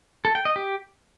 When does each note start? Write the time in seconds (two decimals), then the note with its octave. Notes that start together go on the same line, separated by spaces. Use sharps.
0.25 A4
0.35 G5
0.45 D#5
0.56 G4